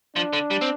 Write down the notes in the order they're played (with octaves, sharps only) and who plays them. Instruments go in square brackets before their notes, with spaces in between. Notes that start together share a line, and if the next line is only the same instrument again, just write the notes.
[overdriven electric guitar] F3 [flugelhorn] D4
[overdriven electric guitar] D3
G3
C4